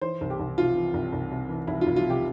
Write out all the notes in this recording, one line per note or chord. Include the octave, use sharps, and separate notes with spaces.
E3 C5
C2
G4
C2
C3 F4
E3
C2
C2
C3
E3
C2 E4
F4
C2
F4
C3 G4